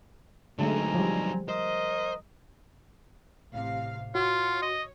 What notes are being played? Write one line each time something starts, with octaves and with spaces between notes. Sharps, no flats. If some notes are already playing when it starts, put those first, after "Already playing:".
D3 F#3 G#3 A3 C4 D#4 G#5 A#5
F3 G3
A#4 C5 D#5
A1 C3 F5
F4 F#4 C#5 C6
D#5